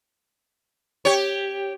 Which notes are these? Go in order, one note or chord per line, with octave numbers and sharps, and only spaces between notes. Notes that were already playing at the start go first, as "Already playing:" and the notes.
G4 C#5